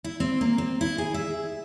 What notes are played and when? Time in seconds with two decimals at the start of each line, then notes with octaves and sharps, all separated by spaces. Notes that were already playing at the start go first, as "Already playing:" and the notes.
0.04 E4
0.20 C4
0.41 A#3
0.58 C4
0.81 E4
0.98 G#4
1.14 E5